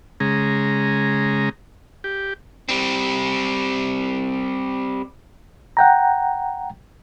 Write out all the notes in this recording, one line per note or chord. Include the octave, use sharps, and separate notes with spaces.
C#3 G#3 A#5
G4
G3 C4
F#5 G5 A#5